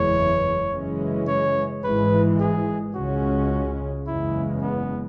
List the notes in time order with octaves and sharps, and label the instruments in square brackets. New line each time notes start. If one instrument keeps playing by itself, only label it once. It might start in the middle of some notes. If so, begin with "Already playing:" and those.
Already playing: [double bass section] F#1 E2 E3 G#3 [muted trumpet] C#5
[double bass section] F#2 C#3 E3 G#3 C#4
[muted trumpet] C#5
[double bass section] G#1 G#2 E3 G#3 [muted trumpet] B4
[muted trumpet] G#4
[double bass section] C#2 C#3 G#3 C#4 [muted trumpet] F#4
[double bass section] F#1 E2 C#3 G#3 [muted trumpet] E4
[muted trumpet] B3